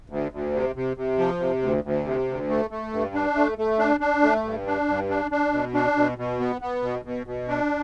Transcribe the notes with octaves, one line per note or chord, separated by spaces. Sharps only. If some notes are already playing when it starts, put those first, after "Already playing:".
D2
D2
C3
C3
C3
F3
C3
D2
D2
C3
D2
A3
A3
G2
D4
A3
A3
D4
D4
A3
G2
D4
G2
D4
D4
B2
D4
B2
B2
B3
B3
B2
B2
B2
D4